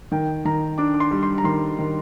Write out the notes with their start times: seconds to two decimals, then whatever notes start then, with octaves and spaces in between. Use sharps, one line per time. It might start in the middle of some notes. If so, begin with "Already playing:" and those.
0.12 D#3 G5
0.45 D#3 A#5
0.78 D4 D6
0.94 D6
1.00 C6
1.11 G3
1.23 C6
1.38 A#5
1.44 D#3 C6
1.79 D#3